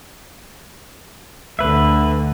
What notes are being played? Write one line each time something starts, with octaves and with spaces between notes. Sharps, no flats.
D2 D3 B4 E5